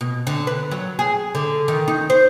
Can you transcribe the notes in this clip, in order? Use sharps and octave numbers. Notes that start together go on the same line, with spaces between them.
B2
D3
B4
F#3
G#4
D3
D#3
D#4
C5